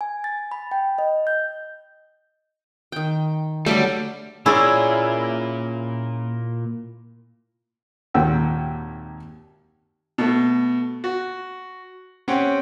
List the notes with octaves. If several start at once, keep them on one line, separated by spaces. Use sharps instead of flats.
G#5
A6
B5
G5
D#5
G6
D#3 G5
D3 F#3 G3 A3 A4
A#2 A#3 C#4 E4 G#4 D5
G#1 D#2 A#2 F#5 G5 E6
B2 A3
F#4
C4 C#4 G4 F#5 G5